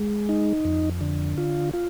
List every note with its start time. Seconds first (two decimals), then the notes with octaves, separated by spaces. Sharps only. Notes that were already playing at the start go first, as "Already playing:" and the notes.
Already playing: G#3
0.29 D#4
0.65 F2
1.01 D3
1.38 F4
1.73 F4